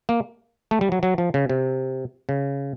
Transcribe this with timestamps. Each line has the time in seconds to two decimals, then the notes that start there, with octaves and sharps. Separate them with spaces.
0.09 A#3
0.71 A3
0.81 G3
0.92 F#3
1.03 F#3
1.18 F3
1.34 C#3
1.49 C3
2.29 C#3